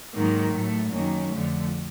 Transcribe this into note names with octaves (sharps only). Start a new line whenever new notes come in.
G#2 D#3 F#3 A#3
A2 F#3 A3
F#2 D#3 F#3 A#3 C#4
F2 D3 F3 A3